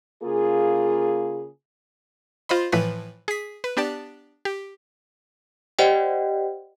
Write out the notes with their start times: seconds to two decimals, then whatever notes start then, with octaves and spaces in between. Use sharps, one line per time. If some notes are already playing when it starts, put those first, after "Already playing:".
0.23 C#3 A#3 F4 G#4
2.49 F4 C5 D#5 B5
2.72 A2 E3 F3 B4 B5
3.28 G#4 B6
3.64 B4
3.77 B3 D4 G4 D5 A5
4.45 G4
5.79 G4 C5 D5 D#5 F#5 G5